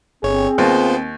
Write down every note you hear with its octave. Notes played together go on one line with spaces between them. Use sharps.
G1 C4 G#4 C#5
D#2 B3 F4 C5